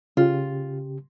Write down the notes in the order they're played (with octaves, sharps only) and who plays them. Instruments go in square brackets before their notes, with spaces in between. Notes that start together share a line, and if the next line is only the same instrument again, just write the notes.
[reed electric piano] C#3 G4 [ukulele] F4